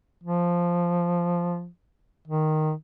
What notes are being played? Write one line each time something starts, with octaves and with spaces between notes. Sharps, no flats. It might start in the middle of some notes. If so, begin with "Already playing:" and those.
F3
D#3